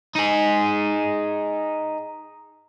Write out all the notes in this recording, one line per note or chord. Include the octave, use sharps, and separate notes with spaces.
D#4 G#4